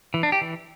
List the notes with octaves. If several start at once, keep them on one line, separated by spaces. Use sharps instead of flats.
E3
D4
G4
E3